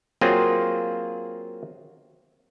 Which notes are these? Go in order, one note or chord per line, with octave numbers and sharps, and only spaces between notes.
F#3 A#3 C4 F4 G#4